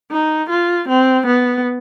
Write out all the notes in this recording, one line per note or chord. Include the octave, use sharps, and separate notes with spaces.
D#4
F4
C4
B3